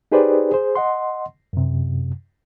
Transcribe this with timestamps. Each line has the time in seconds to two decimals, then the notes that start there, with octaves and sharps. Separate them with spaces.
0.12 D#4 G4 G#4 B4 C5 D5
0.51 G#4 C5
0.75 D#5 F#5 C6
1.53 F#2 C3